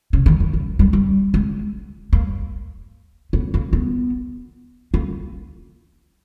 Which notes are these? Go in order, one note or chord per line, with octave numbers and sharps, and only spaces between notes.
C#3
D#3
E3
F3
G3
G3
G#3
A#3
B3
A#3
B3
A#3